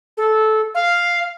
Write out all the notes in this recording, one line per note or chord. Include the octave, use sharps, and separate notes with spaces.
A4
F5